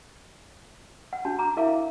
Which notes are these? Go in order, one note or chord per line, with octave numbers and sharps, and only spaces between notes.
F#5
D4 F#4 A5
A#5 D6
E4 A#4 E5 F5 D6